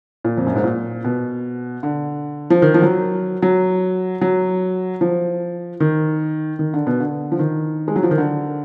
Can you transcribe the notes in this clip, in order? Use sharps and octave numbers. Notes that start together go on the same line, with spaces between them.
A#2
F2
F#2
G#2
A#2
B2
D3
F3
D#3
F3
F#3
F#3
F#3
F3
D#3
D#3
D3
B2
D3
F3
D#3
G#3
F#3
F3
D#3
D3